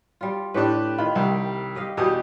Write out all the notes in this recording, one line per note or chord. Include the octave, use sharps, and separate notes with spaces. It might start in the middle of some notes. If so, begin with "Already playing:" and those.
G3 F4
A2 D4 G4 B4
D#3 F4 B5
C2 G3
G4 D#5 F5
E2 B2 G3 G4 D#6